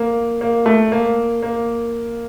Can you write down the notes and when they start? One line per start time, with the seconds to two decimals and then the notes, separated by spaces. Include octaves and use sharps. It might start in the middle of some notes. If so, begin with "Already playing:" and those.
Already playing: A#3
0.41 A#3
0.66 A3
0.92 A#3
1.43 A#3